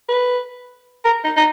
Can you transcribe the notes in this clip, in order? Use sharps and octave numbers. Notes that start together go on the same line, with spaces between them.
B4
A#4
D#4
D#4